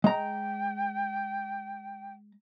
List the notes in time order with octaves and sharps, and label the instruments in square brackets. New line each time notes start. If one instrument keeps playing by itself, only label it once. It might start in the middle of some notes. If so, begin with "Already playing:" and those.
[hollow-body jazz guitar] G#3 A#5 [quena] G5